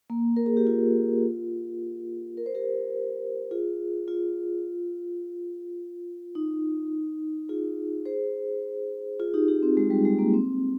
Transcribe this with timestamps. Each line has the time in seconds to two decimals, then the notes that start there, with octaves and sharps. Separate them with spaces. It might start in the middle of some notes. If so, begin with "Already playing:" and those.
0.10 A#3
0.37 A#4
0.46 G#4
0.57 G4
0.67 F4
2.37 A#4
2.46 C5
2.55 G4 A#4
3.51 F4 G#4
4.08 F4
6.35 D#4
7.49 F4 G#4
8.06 G#4 C5
9.20 F4 G#4
9.34 D#4 G4
9.48 D#4 G4
9.63 C4
9.77 G#3
9.90 G3
10.05 G#3
10.19 A#3
10.33 C4